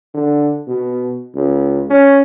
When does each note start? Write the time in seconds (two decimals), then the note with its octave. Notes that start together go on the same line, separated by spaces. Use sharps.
0.14 D3
0.67 B2
1.35 C#2
1.90 C#4